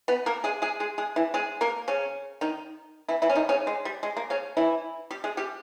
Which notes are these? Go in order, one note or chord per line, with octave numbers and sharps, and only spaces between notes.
B3 B4
A#3 A#4
G#3 G#4
G#3 G#4
G#3 G#4
G#3 G#4
E3 E4
G#3 G#4
A#3 A#4
C#3 C#4
D#3 D#4
E3 E4
E3 E4
C#4
D#3 D#4
C#3 C#4
G#3
G3
G#3
A#3
C#3 C#4
E3 E4
G3 G4
G#3 G#4
G3 G4